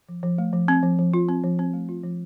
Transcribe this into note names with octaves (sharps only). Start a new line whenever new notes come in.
F3
F3
A3
F3
C4
F3
F3
F4
C4
F3
C4
A3
F4
F3